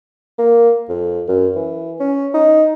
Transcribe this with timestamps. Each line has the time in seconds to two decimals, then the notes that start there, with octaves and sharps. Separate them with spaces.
0.38 A#3
0.89 F2
1.28 F#2
1.56 E3
2.00 C#4
2.34 D#4